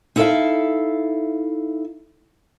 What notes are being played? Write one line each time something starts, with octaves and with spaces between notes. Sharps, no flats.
D#4 E4 A4 C5 E5 F5